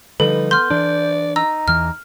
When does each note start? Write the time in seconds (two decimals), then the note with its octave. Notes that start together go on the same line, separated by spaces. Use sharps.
0.20 D3 F3 G3 D#4 A4 B4
0.51 B3 C6 F6 G6
0.70 E3 D4 D5
1.36 D#4 A#5 E6
1.68 E2 E3 F6